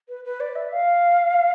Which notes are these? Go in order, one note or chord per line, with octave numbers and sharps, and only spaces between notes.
B4
B4
D5
E5
F5